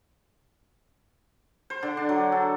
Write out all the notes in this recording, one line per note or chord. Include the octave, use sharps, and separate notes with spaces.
C5
D3
D4
F#3
A4